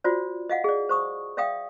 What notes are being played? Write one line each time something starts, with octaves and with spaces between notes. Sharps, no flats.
F4 F#4 C5 D5
D#5 F5 F#5
G#4 D5
C5 C#6 D#6
D5 E5 F5 G5 D#6